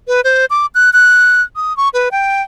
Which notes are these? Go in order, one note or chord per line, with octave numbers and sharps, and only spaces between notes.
B4
C5
D6
F#6
F#6
D#6
C#6
B4
G5